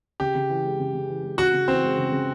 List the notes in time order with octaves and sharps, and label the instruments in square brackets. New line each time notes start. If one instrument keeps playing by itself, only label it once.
[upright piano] C#3 [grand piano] G4
[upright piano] C#3
E3
G#3
C#3
C#3
E3
G#3
[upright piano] C#3 [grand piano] F#4
[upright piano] C#3
[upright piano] E3 [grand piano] C4
[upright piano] G#3
C#3
C#3